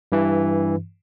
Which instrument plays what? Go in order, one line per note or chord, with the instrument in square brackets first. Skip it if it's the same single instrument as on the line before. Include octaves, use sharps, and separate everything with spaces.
[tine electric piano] G2 E3